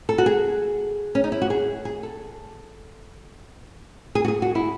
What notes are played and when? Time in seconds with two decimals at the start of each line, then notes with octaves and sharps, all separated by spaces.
0.09 A4
0.18 F#4
0.26 G#4
1.15 C#4
1.24 D#4
1.32 E4
1.42 F#4
1.50 G#4
1.85 G#4
2.03 A4
4.15 G#4
4.25 F#4
4.28 G#4
4.42 F#4
4.55 E4